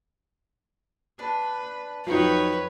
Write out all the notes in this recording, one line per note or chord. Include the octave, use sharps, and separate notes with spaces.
D4 B4
F2 F#3 D#4 B4 C#5 F5 G5 C#6